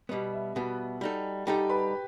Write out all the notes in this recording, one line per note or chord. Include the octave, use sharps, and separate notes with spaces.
B2 G3 B3 D#5
E5
B2 G3 B3 F#4 F#5
G3 D#4 A4
G3 D#4 G4 A4 G5
B4 B5